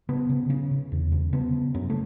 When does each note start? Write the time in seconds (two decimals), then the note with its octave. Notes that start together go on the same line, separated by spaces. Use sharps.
0.09 C#3 B3
0.29 C#3
0.49 C#3 C#4
0.71 C#3
0.92 E2
1.12 C#3
1.33 C#3 B3
1.53 C#3
1.74 F#2 C#4
1.90 A3